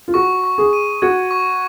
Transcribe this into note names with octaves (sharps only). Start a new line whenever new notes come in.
F4
F#4 C#6
C#6
G#4
D#7
F#4 G#6
C#6